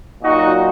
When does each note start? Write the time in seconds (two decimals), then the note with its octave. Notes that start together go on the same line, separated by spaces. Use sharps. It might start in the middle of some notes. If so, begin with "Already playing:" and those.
0.23 A#2 F#3 D#4 F#4